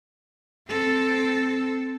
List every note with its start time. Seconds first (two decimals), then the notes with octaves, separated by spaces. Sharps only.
0.68 C4 A4